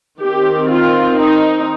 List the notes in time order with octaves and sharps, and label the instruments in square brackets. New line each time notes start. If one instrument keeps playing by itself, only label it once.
[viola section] D#3 C4 G4
F4
D#4